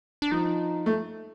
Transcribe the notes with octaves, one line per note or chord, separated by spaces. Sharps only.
D4
F3 D#4
A3